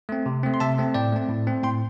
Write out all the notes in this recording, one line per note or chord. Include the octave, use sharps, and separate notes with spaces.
A3 C4
C3
A3 C4
C6
C3 E5 A5
A3 C4
A2 D5 G5
A3 C4
A2
A3 C4
A2 G5 C6